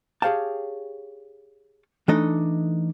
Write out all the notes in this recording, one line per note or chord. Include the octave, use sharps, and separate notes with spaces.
G4 G#4 C#5 F5 G5 A5
E3 A3 D4 D#4 A4 D#5